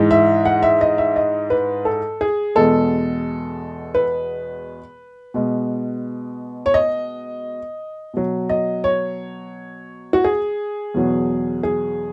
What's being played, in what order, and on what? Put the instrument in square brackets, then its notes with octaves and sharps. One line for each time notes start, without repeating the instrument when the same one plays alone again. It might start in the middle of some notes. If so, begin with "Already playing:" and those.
Already playing: [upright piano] G#2 E3 G#3
E5
F#5
E5
D#5
E5
D#5
B4
A4
G#4
E2 B2 G#3 A4
B4
B2 G#3
C#5
D#5
B2 F#3
D#5
C#5
F#4
G#4
E2 B2 F#3
G#4